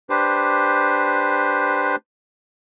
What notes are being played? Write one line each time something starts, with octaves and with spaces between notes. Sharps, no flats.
D4 G4 B4 C5